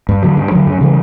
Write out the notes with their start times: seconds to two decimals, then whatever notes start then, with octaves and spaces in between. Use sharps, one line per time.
0.09 G2
0.23 D3 F#3
0.37 G2
0.52 D3 F#3
0.67 F#2
0.81 C#3 E3 G3